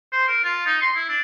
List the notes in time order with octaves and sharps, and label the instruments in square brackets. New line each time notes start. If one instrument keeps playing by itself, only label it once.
[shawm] C5
A#4
F4
D#4
C6
E4
D4